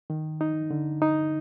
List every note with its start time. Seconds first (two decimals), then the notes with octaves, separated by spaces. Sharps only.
0.10 D#3
0.41 D#4
0.71 D3
1.02 D#4